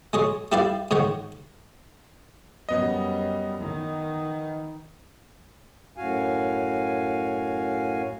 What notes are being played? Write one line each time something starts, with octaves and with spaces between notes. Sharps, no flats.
G#3 G#4 C#5
G3 E4 G4 B4 D5 F5
G#2 D#3 C#5 F#5
F#2 G3 B3 D#5
D#3
F#2 A2 F#4 F5 G#5